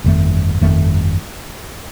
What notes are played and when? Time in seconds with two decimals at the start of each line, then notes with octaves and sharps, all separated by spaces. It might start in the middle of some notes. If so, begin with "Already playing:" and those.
0.04 G1 F2 D#3 A3
0.61 G1 F2 D#3 A3